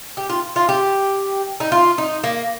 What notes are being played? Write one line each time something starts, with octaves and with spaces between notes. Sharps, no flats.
G4
F4
F4
G4
D#4
F4
D#4
A#3